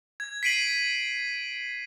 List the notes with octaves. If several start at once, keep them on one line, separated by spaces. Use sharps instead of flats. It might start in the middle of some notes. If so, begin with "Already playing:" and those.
G#6
B6 C7 D7 D#7 F#7